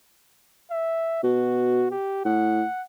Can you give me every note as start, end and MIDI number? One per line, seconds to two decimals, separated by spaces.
0.71 1.20 76
1.24 1.91 47
1.24 1.88 66
1.91 2.21 67
2.25 2.63 45
2.25 2.82 78